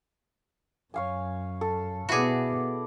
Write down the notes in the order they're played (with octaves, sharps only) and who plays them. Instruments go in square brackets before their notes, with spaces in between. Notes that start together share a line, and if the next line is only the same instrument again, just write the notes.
[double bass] F#2 [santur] C#5 F5 G#5
[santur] A4
[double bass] B2 B3 [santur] E4 D5 [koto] F#4 G#4